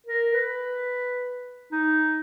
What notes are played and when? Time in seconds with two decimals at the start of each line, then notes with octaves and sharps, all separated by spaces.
0.07 A#4
0.34 B4
1.72 D#4